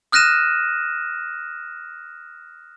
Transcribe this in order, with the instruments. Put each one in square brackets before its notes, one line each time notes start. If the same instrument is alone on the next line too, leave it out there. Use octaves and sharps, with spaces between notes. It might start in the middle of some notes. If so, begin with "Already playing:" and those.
[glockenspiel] D#6 F6 F#6 A#6 D#7 E7